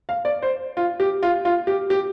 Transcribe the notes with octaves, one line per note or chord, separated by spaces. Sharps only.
F5
D5
C5
F4
G4
F4
F4
G4
G4